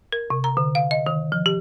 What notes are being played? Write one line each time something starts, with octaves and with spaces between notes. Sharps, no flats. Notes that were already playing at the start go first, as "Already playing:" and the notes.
A#4
C3
A#5
D3
F5
D#5
D#3
F3
G4